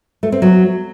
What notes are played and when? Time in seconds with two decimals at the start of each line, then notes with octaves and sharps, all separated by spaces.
0.23 A3
0.32 C4
0.42 F#3